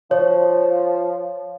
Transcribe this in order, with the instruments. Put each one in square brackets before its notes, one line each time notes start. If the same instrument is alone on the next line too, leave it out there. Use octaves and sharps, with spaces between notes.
[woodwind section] F3 [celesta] C#5